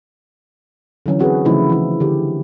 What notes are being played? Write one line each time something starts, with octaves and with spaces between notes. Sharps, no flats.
D3 E3 F#3 C#4
C4 F#4 G#4 A4 B4
C#3 E3 F3 A3 D#4 E4
E3 E4
D3 G4